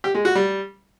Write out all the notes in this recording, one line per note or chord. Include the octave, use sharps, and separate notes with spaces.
G4
G#3
F#4
G3